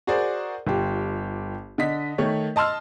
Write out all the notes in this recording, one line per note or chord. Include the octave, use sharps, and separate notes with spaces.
F#4 G#4 A#4 C5 D5
G1 F4 G4
D3 D#5 B6
D#3 A3 C#5
D#5 A5 C6 E6 F6